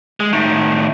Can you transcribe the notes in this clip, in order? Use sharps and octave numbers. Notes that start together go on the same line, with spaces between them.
G#3
A2 D#3